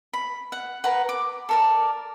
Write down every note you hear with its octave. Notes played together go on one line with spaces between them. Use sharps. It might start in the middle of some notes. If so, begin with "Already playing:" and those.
B5
F#5
A#4 B4 F#5
D6
A4 A#4 D5